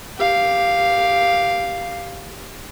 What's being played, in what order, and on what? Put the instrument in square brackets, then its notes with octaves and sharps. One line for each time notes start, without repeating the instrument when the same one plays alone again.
[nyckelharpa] G4 F5